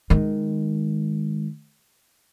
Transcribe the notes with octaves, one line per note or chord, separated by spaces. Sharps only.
D#3 G#3